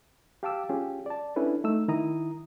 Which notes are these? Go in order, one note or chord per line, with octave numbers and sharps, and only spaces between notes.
G4 F5 A5 D6 E6
C#4 F4 G4 G#4
D5 A5
C#4 D4 E4 A4 B4
A3 D#4 E6
D#3 E4 A#5 D#6